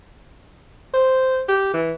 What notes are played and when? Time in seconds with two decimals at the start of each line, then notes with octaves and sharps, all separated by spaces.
0.94 C5
1.48 G4
1.74 E3